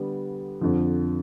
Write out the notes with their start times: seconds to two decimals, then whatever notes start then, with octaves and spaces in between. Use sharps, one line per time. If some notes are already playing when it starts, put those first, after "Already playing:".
Already playing: D3 G3 B3
0.61 F2 D3 F3